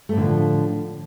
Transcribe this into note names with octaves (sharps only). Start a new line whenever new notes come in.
A2 D3 F3 A3